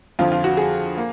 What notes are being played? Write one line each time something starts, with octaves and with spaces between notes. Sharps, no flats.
F2 D3 F3 F4
F4
F#4
G#4
A#3